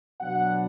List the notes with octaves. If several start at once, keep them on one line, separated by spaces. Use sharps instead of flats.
B2 F#3 B3 D4 F#5